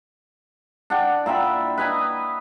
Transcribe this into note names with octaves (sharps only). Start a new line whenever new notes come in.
D4 F#5 G5
A#2 E5 G5 B5
B4 D#5 G#5 A#5